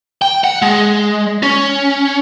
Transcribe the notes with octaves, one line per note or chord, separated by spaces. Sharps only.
G5
F#5
G#3
C#4